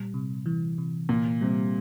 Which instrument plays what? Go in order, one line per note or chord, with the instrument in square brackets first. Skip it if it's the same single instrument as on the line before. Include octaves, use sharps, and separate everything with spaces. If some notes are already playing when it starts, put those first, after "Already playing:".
Already playing: [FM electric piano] A#2 G3
C3
E3
C3
[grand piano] A#2 [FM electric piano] E3
[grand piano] C3 [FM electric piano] G3